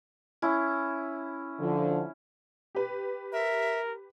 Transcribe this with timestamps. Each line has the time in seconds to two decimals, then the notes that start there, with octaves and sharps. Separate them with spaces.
0.42 C#4 E4
1.60 D3 F3
2.75 G4 B4
3.33 A#4 E5